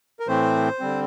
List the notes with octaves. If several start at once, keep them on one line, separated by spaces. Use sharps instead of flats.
A#4
A2 E3 A3 C4 C5
D3 G3 C4